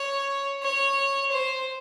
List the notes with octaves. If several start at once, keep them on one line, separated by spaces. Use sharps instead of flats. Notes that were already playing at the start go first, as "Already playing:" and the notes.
Already playing: C#5
C#5
C5